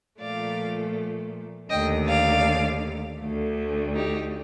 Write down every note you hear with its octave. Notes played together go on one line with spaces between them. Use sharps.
A#2 F3 A3 D5 F5
D#2 D3 A3 D#5 G5
D5 F5
D2 D3 A3
D#4 G4